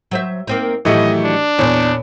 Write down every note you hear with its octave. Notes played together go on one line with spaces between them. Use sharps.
F#3 C5 E5
A#3 C4 D#4
A2 D#3 E3 F#3 A3 G4 D#5
D4
E2 A#2 C#5